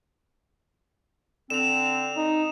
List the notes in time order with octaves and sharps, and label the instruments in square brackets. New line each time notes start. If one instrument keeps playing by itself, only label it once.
[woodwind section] D3 C4 [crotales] E7 F7
[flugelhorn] D#4